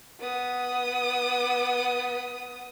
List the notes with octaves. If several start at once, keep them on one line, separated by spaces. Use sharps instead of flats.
B3 D#6